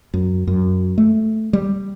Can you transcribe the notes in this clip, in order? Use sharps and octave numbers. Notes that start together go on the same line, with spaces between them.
F#2
F#2
A3
G3